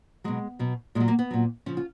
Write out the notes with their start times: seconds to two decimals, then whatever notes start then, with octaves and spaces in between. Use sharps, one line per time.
0.24 B2 F#3 G#3
0.59 B2 F#3
0.95 A#2 G#3
1.00 F#3
1.08 A#3
1.19 B3
1.31 A#2 F#3
1.66 C#3 F3 C#4
1.77 F4